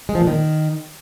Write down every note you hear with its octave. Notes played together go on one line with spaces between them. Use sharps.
G#3
F3
A#2
D#3